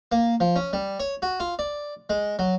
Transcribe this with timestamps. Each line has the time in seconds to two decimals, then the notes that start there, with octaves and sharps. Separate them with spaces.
0.12 A#3
0.40 F3
0.56 C#4
0.73 G3
1.00 C#5
1.22 F#4
1.40 F4
1.59 D5
2.10 G#3
2.39 F#3